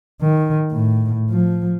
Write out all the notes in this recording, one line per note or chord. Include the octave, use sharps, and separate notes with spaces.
D#3
A2
F3